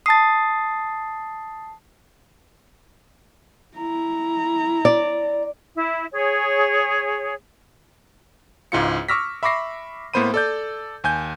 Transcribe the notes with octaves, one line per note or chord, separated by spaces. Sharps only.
A5 D#6 A6 C7
E4 A#5
D5
E4
G#4 C#5
C#2 G#2 E4 F4 F5 C#7
C#6 D6 E6 F6 A#6 B6
E5 B5 C#6 D6 A#6 C7
A2 A#3 B3 C5 B5 D#7
A4 D5 G6
D#2 G#5 G6